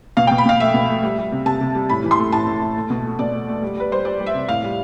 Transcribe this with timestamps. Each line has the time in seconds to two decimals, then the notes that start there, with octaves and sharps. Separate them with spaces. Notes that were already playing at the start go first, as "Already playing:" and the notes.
0.17 B2 F5
0.27 G5
0.31 B2
0.38 B5
0.45 B2 F5
0.60 A3 E5
0.74 B2
0.89 A3
1.03 G3
1.18 G3
1.32 C3
1.46 C3 A5
1.61 C3
1.75 G3
1.89 A2 B5
2.04 E3
2.11 C6
2.18 A3
2.32 A2 A5
2.47 A2
2.61 A2
2.76 A3
2.90 B2
3.05 A3
3.19 B2 D5
3.33 A3
3.48 A3
3.62 G3
3.77 G3 B4
3.92 G3 C5
4.05 G3 D5
4.19 G3
4.26 E5
4.35 C3
4.48 A2 F5
4.63 G3